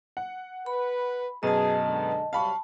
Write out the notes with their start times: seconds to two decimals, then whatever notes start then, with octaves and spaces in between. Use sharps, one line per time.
0.17 F#5
0.66 B4 B5
1.43 F#2 B2 G#4 D#5 A5
1.87 D3 G#3
2.33 C3 F#3 G3 F5 A5 B5 C#6